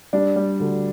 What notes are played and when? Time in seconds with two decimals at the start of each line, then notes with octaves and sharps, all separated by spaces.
0.13 G3 D4
0.36 G3
0.60 D2